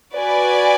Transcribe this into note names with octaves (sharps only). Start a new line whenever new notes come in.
F#4 B4 D5 G#5